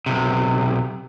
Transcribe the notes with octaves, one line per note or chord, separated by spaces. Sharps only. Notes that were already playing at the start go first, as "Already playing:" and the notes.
B1 C3